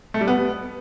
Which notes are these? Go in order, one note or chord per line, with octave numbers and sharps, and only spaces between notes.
A3
G3
B3